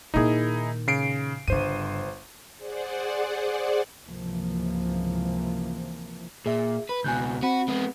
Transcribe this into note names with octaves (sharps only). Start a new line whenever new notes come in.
A#2 D#3 D#4 E4 G#4
C#3 C7 D7
G1 G2 C#3 C5 D#7
G#4 C5 D5 F#5
C#2 G#2 C3 E3 F3 A#3
A#2 G#4 E5
B4
C#2 B2 G#5 F#6 G6
C4 F#4 B5
G#3 B3